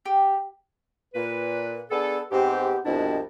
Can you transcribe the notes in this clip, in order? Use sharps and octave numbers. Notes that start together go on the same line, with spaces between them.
G4
A#2 B4
B3 D4 G#4 A4
G#2 B3 C4 G4
C2 F2 B2 D4 E4 D#5